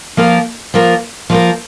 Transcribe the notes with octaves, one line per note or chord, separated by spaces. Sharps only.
F3 A#3 F4 A#4
F3 A#3 F4 A#4
F3 A#3 F4 A#4